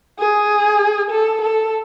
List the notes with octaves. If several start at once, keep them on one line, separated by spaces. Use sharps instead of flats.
G#4
A4
A4